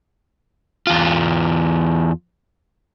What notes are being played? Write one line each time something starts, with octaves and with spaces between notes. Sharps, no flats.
E2 F4